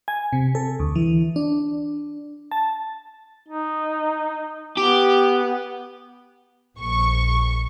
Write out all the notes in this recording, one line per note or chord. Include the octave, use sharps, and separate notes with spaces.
G#5
C3
A4
D2
E3
D4
A5
D#4
B3 G4
A#1 C#6